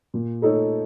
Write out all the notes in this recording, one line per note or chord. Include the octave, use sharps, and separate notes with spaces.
A#2
A3 D#4 A4 C#5